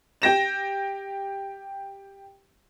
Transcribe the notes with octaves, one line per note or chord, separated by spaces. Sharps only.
G4 G5 A#6 E7